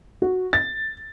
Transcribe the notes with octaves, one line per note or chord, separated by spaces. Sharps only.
F#4
A6